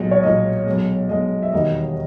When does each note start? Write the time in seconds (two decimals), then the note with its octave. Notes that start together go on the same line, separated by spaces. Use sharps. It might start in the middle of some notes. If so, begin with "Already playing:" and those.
Already playing: B1 A#2 G#3
0.11 C#5
0.23 B1 A#2 G#3 D#5
0.66 B1 B2 G#3
1.09 B1 B2 G#3 D#5
1.43 E5
1.53 E1 D#2 D#3 G3 D#5